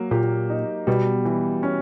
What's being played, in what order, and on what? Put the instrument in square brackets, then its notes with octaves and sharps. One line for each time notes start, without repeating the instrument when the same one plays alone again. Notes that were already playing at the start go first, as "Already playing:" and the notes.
Already playing: [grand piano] F#3 A#3
[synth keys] A#2 [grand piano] G4
[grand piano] D#4
[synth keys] B2 [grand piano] G3
[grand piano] E3
C#4